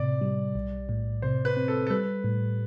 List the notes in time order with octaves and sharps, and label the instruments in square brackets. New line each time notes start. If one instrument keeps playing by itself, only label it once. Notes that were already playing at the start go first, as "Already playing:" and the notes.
Already playing: [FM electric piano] A2 C3 [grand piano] D5
[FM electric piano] G3
B1
A2
[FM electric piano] C3 [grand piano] C5
[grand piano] B4
[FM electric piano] C4
[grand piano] A4
A4
[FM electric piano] G3 [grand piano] B4
[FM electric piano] A2